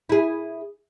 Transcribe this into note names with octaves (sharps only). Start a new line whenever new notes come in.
E4 G#4